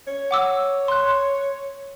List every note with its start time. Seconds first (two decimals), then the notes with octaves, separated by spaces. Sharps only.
0.08 C#5
0.31 F#5 D6 E6
0.88 C6 F#6